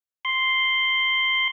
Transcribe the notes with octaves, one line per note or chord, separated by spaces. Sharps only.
C6